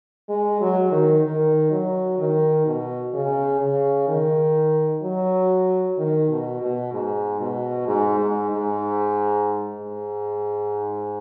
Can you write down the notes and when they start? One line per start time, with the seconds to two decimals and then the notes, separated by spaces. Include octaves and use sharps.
0.29 G#3
0.61 F#3
0.92 D#3
1.24 D#3
1.71 F#3
2.19 D#3
2.66 B2
3.14 C#3
3.61 C#3
4.08 D#3
5.03 F#3
5.98 D#3
6.30 B2
6.61 B2
6.93 G#2
7.40 B2
7.87 G#2
8.19 G#2
8.51 G#2
9.78 G#2